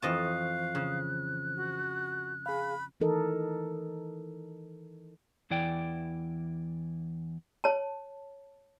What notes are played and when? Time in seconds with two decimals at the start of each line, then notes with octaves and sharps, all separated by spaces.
0.02 F2 E3 C5 D#5 F5 A5 C#6 F#6
0.75 C#3
1.56 F#4
2.46 G#4 F5 B5
3.00 D#3 E3 D#4 A4 A#4 D#5
5.50 E2 E3 E4 D5 G5
7.64 C#5 A5